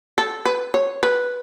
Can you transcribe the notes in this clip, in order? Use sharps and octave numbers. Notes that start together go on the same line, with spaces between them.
A4
B4
C#5
B4